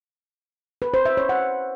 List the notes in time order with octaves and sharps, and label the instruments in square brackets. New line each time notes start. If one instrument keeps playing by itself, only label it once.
[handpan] B4
C5
E5
C#5
F#5